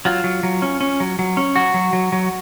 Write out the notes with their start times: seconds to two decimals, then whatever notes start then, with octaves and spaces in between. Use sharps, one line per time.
0.05 F#3 F4
0.24 F#3
0.43 F#3
0.62 C#4
0.81 C#4
1.00 F#3
1.19 F#3
1.37 C#4
1.56 F#3 F#4
1.74 F#3
1.93 F#3
2.12 F#3